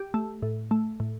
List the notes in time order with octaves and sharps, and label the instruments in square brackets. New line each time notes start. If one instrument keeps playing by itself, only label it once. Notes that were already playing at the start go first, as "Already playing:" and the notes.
Already playing: [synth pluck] G4
A3
A2
A3
A2